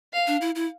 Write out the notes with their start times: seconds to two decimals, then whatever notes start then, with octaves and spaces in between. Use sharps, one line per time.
0.13 F5
0.27 D4
0.41 E4
0.55 E4